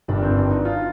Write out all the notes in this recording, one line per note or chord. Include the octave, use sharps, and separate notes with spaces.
G1 G2 D#3 D4
C4
D4
D#4
F4